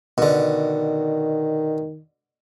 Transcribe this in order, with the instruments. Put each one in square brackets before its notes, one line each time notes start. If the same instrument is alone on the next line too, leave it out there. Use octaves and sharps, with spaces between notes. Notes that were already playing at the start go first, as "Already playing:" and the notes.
[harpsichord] B2 D3 [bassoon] D#3